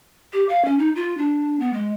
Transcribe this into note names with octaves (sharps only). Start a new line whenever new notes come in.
G4
F5
C#4
D#4
F4
D4
B3
G#3